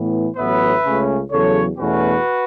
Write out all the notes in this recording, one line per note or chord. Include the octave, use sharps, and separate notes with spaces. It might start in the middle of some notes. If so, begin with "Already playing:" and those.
Already playing: A2 E3 B3
A1 A2 F#3 B3 B4 E5
C#2 C#3 A3 C#4
E2 C#3 F#3 A4 C#5
E2 B2 A3 C#4 F#4 B4